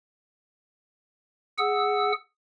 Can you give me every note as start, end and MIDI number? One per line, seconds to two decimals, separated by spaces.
1.58 2.12 68
1.58 2.12 78
1.58 2.12 88